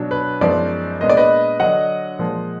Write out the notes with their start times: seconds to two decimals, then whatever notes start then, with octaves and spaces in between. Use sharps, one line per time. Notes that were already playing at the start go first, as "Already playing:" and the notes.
Already playing: B2 F#3 D4
0.11 B4
0.41 F#2 F3 G#3 B3 D#4 D5
1.01 A#2 G#3 B3 D4 D#5
1.09 D5
1.17 B4 D#5
1.60 D3 F#3 D4 D#5 F#5
2.19 A#2 F3 G#3